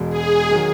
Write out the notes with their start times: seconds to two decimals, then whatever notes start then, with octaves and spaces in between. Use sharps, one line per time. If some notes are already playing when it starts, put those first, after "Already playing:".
Already playing: E1 E2 B2 G#3
0.10 G#4
0.51 D#3 F#3